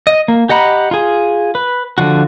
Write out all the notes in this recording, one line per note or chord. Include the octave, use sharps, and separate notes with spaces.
D#5
A#3
G4 D#5 F#5 A#5 B5
F4 G#4
B4
D3 F3 F#4